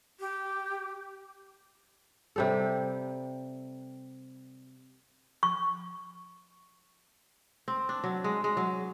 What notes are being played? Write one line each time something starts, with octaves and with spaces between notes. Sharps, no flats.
G4
C3 G3 A4
C#6
C4
D4
F#3
G#3
G#3
F#3